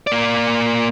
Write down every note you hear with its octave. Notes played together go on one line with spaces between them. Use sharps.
A#3 D5